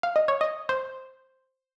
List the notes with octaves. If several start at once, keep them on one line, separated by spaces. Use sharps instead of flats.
F5
D#5
C#5
D#5
C5